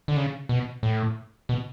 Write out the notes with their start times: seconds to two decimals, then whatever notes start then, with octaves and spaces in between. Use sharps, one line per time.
0.08 D3
0.16 C#3
0.49 B2
0.83 A2
1.49 B2